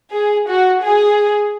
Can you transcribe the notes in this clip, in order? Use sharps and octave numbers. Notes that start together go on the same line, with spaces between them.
G#4
F#4
G#4